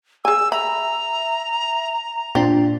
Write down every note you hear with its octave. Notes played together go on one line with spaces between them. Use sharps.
G#4 G#5 E6
E5 A#5 B5
A#2 C4 D4 F4